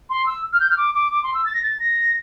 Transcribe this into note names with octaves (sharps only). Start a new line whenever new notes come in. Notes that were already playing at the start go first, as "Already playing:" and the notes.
C6
E6
F6
G6
F6
D6
D6
D6
C6
E6
A6
A#6
A6
A#6